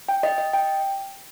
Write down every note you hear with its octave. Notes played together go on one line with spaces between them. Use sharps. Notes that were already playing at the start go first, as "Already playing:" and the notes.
G5
D#5
D#5
G5